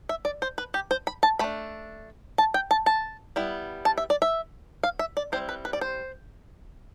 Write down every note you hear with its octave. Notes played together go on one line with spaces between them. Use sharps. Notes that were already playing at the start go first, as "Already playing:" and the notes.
E5
D5
C5
B4
G4
C5
B5
A5
A3 D4 B5
A5
G5
A5
A5
G3 B3 E4
A5
E5
D5
E5
F5
E5
D5
G3 C4 E4 C5
B4
B4
D5
C5